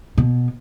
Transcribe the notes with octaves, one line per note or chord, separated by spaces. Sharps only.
B2